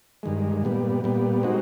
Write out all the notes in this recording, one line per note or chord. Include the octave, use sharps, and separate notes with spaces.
G2 D#3 G#3
A#2 G3 B3
A#2 G3 B3
G#3 C4 D#4 F#4